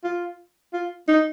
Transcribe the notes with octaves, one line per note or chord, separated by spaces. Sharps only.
F4
F4
D#4